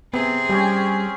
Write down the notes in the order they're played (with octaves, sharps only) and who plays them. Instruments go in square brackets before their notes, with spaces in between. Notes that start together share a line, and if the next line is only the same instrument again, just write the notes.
[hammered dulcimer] C3 [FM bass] B3 [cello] C4 G#4
[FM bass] G3 [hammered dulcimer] C#4 G4 G#5